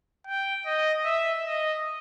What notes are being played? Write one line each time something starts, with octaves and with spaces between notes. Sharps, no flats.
G5
D#5
E5
D#5